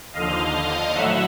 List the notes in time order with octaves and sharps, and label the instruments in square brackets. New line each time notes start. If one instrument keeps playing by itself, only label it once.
[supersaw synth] D#2 D3 F3 D#5 F5
A2 F#3 E5 F#5